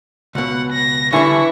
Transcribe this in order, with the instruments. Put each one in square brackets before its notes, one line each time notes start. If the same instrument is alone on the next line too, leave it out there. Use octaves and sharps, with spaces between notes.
[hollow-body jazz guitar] C#2 B2 [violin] F#5
[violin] A#6
[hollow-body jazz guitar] D3 G3 D4 [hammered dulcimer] E3 [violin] E4 C#6